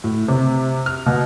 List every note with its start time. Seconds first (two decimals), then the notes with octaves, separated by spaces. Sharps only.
0.04 A2
0.28 C3
0.86 F6
1.06 B2